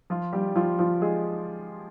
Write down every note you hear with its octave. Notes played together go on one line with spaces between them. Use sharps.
F3 F4
G3 G4
F3 F4
F3 F4
G#3 G#4